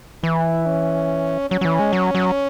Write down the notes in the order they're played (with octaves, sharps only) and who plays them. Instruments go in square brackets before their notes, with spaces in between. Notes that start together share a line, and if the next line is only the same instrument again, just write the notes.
[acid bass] E3 [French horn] E4
[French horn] C#4
[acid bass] F#3 [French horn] C#4
[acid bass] F#3
E3
G#3
F#3
F#3